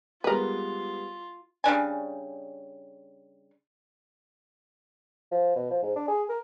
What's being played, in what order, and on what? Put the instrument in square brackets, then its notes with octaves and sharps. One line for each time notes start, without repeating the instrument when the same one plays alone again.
[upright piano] G3 G#3 B3 [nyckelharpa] F4 [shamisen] A#4 B4
[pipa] C#3 G3 D4 G#5
[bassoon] F3
B2
F3
G#2
D4
G#4
A#4